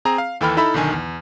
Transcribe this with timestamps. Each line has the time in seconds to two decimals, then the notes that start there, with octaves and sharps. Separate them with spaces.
0.05 C4 G#4 A#5
0.18 F5
0.41 D#2 E3 A4 G5 B5 F6
0.57 D#4 E4 A4 E5 B5
0.74 B1 D3 D#3 G#5
0.93 E2